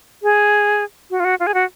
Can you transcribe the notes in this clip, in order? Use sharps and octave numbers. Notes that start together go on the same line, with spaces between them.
G#4
F#4
F4
F#4
F4
G#4
F#4